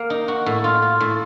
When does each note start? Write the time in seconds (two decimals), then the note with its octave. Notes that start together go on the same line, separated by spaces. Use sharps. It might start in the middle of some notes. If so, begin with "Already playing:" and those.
Already playing: A#3
0.10 D#4
0.28 F#4
0.46 A2
0.64 F4
0.82 F4
1.00 A2